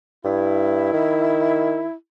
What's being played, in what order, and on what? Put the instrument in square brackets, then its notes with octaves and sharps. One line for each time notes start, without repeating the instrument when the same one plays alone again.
[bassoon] G2 [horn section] E4
[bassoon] D#3